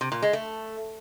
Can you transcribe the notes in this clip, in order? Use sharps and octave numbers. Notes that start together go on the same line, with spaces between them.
C3
A#2
G#3
A3